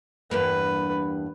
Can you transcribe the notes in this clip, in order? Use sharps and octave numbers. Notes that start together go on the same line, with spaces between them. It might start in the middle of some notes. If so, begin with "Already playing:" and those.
E2 G2 A#3 B4